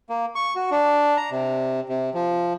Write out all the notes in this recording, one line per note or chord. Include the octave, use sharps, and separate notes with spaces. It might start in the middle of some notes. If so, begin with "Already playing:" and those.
A#3
C#6
F#4
D4
A#5
C3
C3
F3